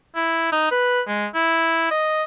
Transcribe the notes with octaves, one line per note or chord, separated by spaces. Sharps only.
E4
D#4
B4
G#3
E4
D#5